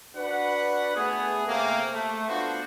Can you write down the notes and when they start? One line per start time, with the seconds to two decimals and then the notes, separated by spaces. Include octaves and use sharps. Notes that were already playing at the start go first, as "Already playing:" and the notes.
0.15 D4 F#4 B4 F#5
0.95 A3 B3 G#4
1.47 C3 A3 A#3
1.93 A3
2.28 B3 D4 F4 F#4 C5